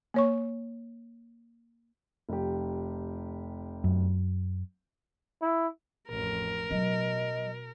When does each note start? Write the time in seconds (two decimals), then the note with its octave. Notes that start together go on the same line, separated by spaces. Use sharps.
0.14 A#3 C#5 C#6
2.29 F1 G4
3.84 F#2
5.42 E4
6.09 A1 F2 A#4
6.71 B2 F#3 D#5